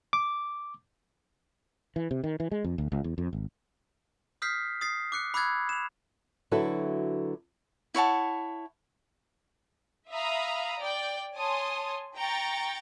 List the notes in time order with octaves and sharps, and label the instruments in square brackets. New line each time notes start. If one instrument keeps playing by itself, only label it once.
[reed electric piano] D6
[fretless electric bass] E3
C3
D#3
E3
G#3
F2
D2
C#2
E2
F2
G#1
[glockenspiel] D#6 F6 G6 B6 C7
D#6 A6 C7
D6 F#6 C#7
B5 D6 E6 F#6 G#6 A6
E7 F7
[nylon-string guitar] D3 F#3 E4 F#4 A4 B4
[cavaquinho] E4 C#5 F#5 A5
[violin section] E5 F5 A#5 B5 D#6
D5 G5
C#5 G#5 A5 C6 D#6
G5 A#5 C#6 A6